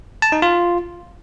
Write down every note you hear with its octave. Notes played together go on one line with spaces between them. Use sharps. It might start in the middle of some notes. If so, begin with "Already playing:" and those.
A5
D#4
F4